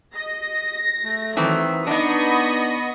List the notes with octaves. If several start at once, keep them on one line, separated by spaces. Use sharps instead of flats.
D#5 A#6
A3
D#3 E3 F#3 C4
B3 D4 D#4 D#5 B5 C#6 D#6